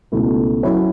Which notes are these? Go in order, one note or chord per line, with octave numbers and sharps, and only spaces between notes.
C#2 B2 A3 E4
F#3 C#4 E4